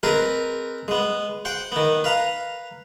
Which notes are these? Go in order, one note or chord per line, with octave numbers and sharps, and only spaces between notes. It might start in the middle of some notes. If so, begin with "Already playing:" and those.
C4 G#4 A#4 B4 D#5
G#3 B3
C5 F#5 G5
D#3 B3
B4 F5 A#5